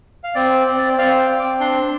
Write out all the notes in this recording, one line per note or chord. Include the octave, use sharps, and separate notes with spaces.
F5
C4 D5
C4
D5
C4 F5
G5
C4
D6
D4 C6